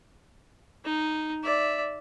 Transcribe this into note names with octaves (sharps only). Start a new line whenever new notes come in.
D#4
D5 E5